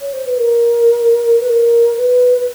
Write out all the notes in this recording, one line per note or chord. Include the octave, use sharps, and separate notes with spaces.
C#5
C5
B4
A#4
B4
A#4
B4
B4